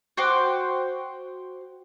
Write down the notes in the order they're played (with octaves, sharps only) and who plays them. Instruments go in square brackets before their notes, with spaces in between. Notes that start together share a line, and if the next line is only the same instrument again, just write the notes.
[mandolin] F#4 C5 G5 D6